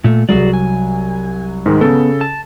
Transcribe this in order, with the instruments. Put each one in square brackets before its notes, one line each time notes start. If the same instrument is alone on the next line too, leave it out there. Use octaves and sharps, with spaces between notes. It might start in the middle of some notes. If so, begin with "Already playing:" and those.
[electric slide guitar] A#2 A3
[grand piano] C2 F#3 [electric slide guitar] F#4 G#4 D5
[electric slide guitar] G#5
[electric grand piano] G#2 D#3 G#3
[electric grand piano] C#3 A4 [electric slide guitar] B3
[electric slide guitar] A5